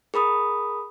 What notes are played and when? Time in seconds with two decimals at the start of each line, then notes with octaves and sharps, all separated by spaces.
0.14 G#4 A#4 B5 D#6